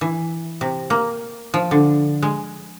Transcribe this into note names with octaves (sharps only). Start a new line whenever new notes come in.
E3
C3
A#3
F3
D3
G#3